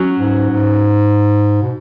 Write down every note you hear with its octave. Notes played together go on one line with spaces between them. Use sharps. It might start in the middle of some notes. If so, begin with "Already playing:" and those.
Already playing: F#3 C#4 F#4
G#2
G#2
B2